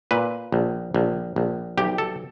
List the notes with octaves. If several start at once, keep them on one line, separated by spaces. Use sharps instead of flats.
A#2 B4
A#1
A#1
A#1
B1 G4
A4